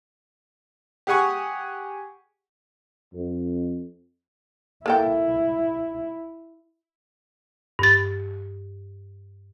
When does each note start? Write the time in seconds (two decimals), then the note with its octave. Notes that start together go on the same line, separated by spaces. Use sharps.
1.07 G4 G#4 F#5 G#5 C#6
3.13 F2
4.86 A#3 E4 A4 G5
7.79 G2 A6